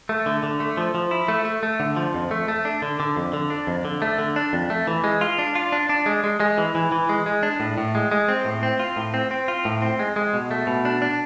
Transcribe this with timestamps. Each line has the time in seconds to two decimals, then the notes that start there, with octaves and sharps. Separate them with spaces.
0.09 A3
0.26 D3
0.43 D3
0.60 A3
0.77 F3
0.95 F3
1.11 E4
1.28 A3
1.45 A3
1.63 A3
1.80 D3
1.96 F3
2.14 F2
2.31 A3
2.48 A3
2.65 D4
2.82 D3
3.00 D3
3.16 F2
3.33 D3
3.50 D4
3.67 F2
3.85 D3
4.02 A3
4.19 D3
4.36 D4
4.53 F2
4.70 A3
4.87 E3
5.04 G#3
5.21 F4
5.38 D4
5.55 F4
5.72 D4
5.89 D4
6.06 G#3
6.24 G#3
6.40 G#3
6.58 E3
6.75 E3
6.92 E3
7.09 G#3
7.26 G#3
7.43 D4
7.60 A2
7.78 A2
7.95 G#3
8.11 G#3
8.28 C4
8.45 A2
8.63 C4
8.79 F4
8.97 A2
9.14 C4
9.31 C4
9.48 F4
9.65 A2
9.82 C4
9.99 G#3
10.16 G#3
10.34 B2
10.51 A3
10.67 B2
10.85 D4
11.02 D4